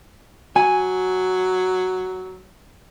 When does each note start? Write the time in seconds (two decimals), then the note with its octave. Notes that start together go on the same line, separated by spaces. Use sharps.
0.56 F#3 G#5